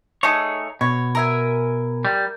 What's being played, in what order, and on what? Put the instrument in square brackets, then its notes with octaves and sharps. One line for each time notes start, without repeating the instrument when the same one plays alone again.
[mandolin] A3 D#4 G#4 [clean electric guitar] C#5
[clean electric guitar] B2 [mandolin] C#5
[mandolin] A#4 E5 G#5
[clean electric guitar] G3